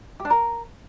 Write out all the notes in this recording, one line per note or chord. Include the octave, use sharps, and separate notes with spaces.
G4
D4
A#4